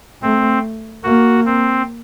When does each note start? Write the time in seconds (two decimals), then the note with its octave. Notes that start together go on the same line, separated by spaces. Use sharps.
0.22 A3 C4
1.04 A#3 F#4
1.45 C4